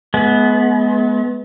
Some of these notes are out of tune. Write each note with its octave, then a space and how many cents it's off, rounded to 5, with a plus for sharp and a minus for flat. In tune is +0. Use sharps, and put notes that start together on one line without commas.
G#3 +40 B3 +0